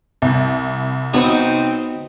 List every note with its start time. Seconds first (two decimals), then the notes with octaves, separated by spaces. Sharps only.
0.22 C2
1.14 B3 C4 D#4 F#4 C#5